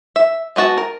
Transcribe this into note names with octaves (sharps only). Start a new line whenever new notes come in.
E5
G#3 B3 F#4 A5
A#4